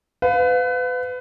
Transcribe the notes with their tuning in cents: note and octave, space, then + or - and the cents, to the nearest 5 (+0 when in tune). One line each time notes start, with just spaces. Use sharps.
B4 +30 F5 +25